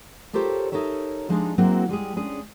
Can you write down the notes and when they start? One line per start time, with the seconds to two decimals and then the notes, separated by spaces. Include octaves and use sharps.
0.33 F4 G4 A4 A#4 C5 C#5
0.72 D#4 A4 A#4 C#5 E5
1.29 F3 G#3 D4 D#4
1.58 F#3 G#3 A#3 C4 E4 F#4
1.89 G3 G#3 G4 G#4
2.16 G#3 C#4 D4 G#4